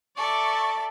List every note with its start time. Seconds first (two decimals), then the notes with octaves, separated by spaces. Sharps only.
0.17 A4 D5 E5 A5 C#6